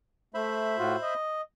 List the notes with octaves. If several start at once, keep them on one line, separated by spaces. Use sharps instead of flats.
A3 C5 E5 B5
A2 F4 F#4
D#5